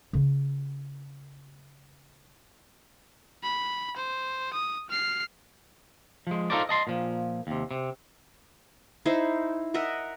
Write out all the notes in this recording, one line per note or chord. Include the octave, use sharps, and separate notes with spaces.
C#3 F4
B5
C5
D#6
F6 C7
F3 G#3
D#4 F4 A4 A#4 C5 D5
D#5 A5 C6
A#2 F3
D#2 C3
C3
D#4 E4 C5
A#4 D#5 E5 F#5